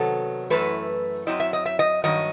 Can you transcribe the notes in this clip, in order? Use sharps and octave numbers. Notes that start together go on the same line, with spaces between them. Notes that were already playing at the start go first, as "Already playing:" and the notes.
Already playing: C3 D#3 F#3 B3 A4
F#2 E3 A3 E4 B4
F#2 F#3 C4 E4 D#5
E5
D#5
E5
D#5
G2 D#3 F#3 D#5